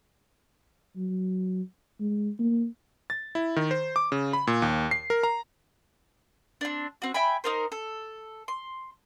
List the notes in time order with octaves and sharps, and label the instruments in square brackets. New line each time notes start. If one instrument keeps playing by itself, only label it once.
[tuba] F#3
G#3
A#3
[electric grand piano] A6
E4
D#3
C5
D6
C#3
B5
A#2
D#2
C7
A#4
A#5
[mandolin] C4 D4
C4 F#4
E5 G5 G#5 B5
D#4 A#4 C5
A4
C6